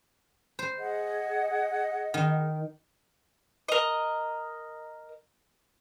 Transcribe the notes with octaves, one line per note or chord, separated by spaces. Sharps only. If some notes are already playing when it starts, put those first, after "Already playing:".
C5
G#4 D#5 F#5
D#3
A#4 D#5